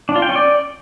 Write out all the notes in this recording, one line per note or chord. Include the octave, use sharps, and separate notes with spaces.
D4
F4
G5
C#4
D5